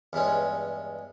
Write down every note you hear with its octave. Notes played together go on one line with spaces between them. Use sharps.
E2 G2 G#3 C#4